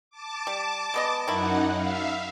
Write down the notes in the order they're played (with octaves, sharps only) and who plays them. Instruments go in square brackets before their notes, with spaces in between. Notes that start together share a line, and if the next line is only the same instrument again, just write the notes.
[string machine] A5 D6
[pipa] G3
G#3 B3 D#5
[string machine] F#2 D#4 F#5 [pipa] D#3 E4
[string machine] E5 F5